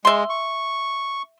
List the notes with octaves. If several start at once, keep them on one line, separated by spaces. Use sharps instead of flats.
G#3 E5 C6
C#6